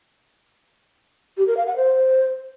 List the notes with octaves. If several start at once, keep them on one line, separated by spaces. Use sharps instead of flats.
G4
A#4
F5
F#5
C5